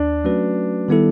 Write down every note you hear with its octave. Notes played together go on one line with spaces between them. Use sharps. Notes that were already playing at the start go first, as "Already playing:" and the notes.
Already playing: D#2 D4
F#3 A3 C#4 F#4 B4
D#3 G3 B3 E4 A4